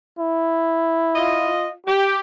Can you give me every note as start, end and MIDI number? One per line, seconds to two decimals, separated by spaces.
0.19 1.51 64
1.16 1.70 65
1.16 1.70 75
1.87 2.19 67